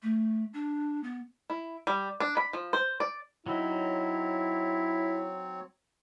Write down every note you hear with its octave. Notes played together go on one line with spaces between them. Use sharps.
A3
D4
B3
E4
G3
D4
B5
F3
C5
D5
F#3 C4 D#4 E4 C#5